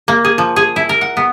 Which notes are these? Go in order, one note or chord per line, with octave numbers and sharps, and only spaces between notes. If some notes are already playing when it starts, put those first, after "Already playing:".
A#3
G#4
F3
G#4
E4
A#4
F#5
B3